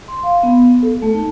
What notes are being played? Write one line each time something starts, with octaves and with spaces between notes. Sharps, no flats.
C6
F5
B3
B3
A4
A3
D#4